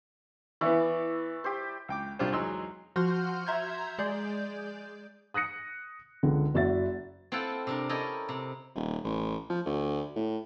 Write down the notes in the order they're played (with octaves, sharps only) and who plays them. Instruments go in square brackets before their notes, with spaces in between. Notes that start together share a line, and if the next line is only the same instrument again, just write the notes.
[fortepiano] E3 B3 [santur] E4 D5 C#6
[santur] G4 C5
[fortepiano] C#2 G5 D6
C2 D4 F4 G4 C5
E2 F#3 G#3 D#4 C6 E6
[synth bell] F3 F#4 F#5 C6 F6 G6
E5 A#5 C6 G6 G#6
G#3 G#4 D5 G6
[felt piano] D#6 F#6 A#6 C#7
C#2 D3
F#1 F#4 D5 E5 A6
[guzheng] C4 E4 F4 A4 F#5 G5
C3 D4 A#4
C#4 E4 A4 A#4 D#5 G5
C3
[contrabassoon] D#1
A1
F3
D2
A2